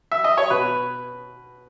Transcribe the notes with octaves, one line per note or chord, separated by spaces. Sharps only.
E5
D#5
C#5
B2 B4